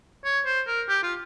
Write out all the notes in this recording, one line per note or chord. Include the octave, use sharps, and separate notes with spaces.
C#5
C5
A#4
G4
F4